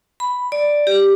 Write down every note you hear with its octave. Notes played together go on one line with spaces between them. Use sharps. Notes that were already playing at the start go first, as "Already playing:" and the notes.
B5
D5
G4